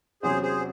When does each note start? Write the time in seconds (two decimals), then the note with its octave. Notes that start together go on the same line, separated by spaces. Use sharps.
0.23 E2 C3 F#3 C#4 G#4 C5
0.42 G#4 C5